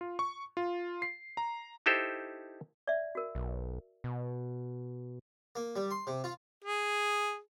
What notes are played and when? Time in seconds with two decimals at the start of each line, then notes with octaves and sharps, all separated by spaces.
0.01 F4
0.19 C#6
0.57 F4
1.02 C7
1.37 A#5
1.86 D#4 E4 G4 A4 C5 E5
2.87 D5 E5
3.15 F#4 A#4
3.35 B1
4.04 B2
5.55 A#3
5.76 G3
5.91 C6
6.07 C3
6.24 F4
6.64 G#4